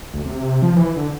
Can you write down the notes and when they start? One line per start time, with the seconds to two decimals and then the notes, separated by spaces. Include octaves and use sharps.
0.14 D2
0.25 C3
0.62 F3
0.76 E3
0.96 D3